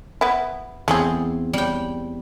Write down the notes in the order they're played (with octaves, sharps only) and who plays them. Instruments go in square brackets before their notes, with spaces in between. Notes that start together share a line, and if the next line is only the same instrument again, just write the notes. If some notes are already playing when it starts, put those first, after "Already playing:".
[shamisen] B3 E4
[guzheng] E2 C4 C6 [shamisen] A3 G#4
[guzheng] G3 G5